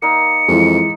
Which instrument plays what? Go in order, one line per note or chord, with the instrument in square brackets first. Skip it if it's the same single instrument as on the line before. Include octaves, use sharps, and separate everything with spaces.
[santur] A#3 D#4 [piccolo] C#7
[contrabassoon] F2 [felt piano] E3 G#3